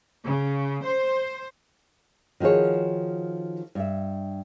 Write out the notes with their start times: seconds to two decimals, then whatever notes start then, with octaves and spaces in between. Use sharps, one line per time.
0.25 C#3
0.83 C5
2.40 D#3 F3 F#4 G#4 C#5
3.75 G2 E5